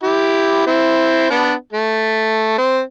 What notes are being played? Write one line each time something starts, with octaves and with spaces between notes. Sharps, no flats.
E4 G4
C4 E4
B3 D4
A3
C4